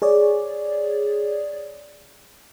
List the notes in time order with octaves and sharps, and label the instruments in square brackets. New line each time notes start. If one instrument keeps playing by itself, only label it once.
[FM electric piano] G#4 C#5 D5